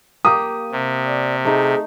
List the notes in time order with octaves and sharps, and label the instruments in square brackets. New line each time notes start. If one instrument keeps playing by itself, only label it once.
[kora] A#3 G4 [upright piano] D#6
[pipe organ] C3
[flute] D5
[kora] A3 D#4 [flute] G#4